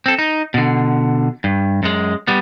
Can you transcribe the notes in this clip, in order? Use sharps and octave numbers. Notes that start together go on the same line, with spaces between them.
C4 A4
D#4
B2 D3
G2
F#2 G#3
G3 B3